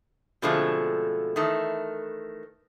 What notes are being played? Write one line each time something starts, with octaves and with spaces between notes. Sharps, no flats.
B2 D3 F3 G#3 A3 C4
D#3 E3 A3